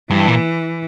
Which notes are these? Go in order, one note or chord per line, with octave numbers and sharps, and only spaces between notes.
G2 E3
A#2